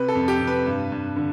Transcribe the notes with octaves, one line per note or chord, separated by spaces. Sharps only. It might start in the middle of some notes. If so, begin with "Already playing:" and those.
Already playing: C3 B4
A4
F2
G4
C3
B4
G2
G2
D3